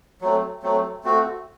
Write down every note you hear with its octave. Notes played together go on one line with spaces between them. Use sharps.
F#3 A3 C4
F#3 A3 C4
A3 C4 F#4